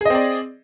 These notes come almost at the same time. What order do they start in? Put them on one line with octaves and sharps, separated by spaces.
G#4 D#5 C4 D5